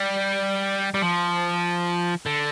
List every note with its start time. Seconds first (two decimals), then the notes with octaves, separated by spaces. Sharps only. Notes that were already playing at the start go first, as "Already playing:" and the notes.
Already playing: G3
0.94 G3
1.02 F3
2.26 D3